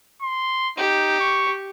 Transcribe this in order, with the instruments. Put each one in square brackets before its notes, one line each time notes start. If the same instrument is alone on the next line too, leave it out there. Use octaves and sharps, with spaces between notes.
[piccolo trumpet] C6
[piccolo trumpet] D#4 [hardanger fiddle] G4
[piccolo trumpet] C#6